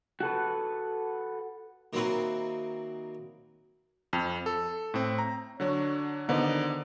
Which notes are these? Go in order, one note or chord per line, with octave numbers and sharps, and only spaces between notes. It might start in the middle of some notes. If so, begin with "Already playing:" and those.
F#4 A4 B4
D#3 F#3 A#3 C4 E4 B4
F2
A4
A2 C4
A#5
D3 F#3 D4 C#5
D3 D#3 B3 C5 D5 D#5 A#5